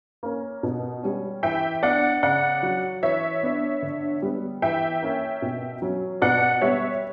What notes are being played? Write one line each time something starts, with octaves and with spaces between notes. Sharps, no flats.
A#3 C#4
B2
G3 C#4
E3 E5 G5
B3 D4 D5 F#5
C#3 D5 F#5
F#3 C#4
E3 C#5 E5
B3 D4
D3
G3 B3
E3 E5 G5
A#3 C#4
B2
F#3 C#4
B2 D5 F#5
G3 B3 C#5 E5